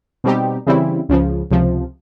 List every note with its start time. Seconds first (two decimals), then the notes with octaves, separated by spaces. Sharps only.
0.24 B2 G3 C4 D#4 G4
0.66 C#3 E3 G3 C4 E4
1.09 C#2 C#3 F3
1.51 C#2 C3 F3